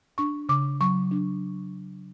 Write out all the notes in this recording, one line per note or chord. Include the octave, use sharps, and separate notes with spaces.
D4 C#6
C#3 D6
F#3 C#6
D4